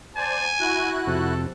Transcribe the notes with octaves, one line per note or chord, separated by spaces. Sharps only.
C5 D5 G#5 A5
E4 F#4 F#6
F2 C3 A4